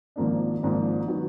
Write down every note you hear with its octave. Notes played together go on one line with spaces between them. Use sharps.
G#1 G#2 F3 A#3 D4
G#1 G#2 F3 A#3 D4
D#3 F#3 B3